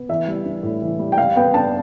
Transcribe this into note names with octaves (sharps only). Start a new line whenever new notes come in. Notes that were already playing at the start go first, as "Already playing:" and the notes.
Already playing: B3
E3 E5
G3
D4
A2
E3
G3
G5
G3 F5
B3 G5
D4 A5